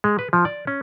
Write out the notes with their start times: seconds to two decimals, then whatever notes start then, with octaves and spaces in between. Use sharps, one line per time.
0.04 G#3
0.19 B4
0.33 F3
0.45 D5
0.67 C#4